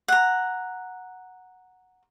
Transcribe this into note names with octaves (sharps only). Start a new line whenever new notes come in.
F#5 A#5